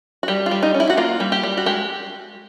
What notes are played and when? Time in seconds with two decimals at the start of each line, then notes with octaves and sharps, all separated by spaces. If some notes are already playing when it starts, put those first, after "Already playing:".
0.23 F#4
0.28 G3 G4
0.46 F4
0.51 G3
0.63 D#4
0.74 C#4
0.80 E4
0.90 F#4
0.97 A#3 F4
1.20 G3
1.32 G4
1.43 G3
1.57 F#4
1.66 G#3 G4